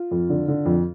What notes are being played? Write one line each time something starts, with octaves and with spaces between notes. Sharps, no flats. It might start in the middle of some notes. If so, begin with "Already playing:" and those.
Already playing: F4
F2
D3
D3
F2